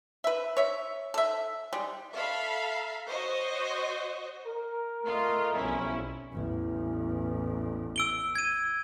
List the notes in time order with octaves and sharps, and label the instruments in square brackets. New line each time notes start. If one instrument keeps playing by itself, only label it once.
[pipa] B4 E5
C#5 E5
A4 E5
G3 G#3
[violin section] A4 E5 F5 B5
F#4 C5 C#5 D#5
[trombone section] A#4
[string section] A3 F4 D#5
[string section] B1 C#4 E4 [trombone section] F2 G3
[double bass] A1 E2
[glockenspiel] E6 D7 G7
G#6 D#7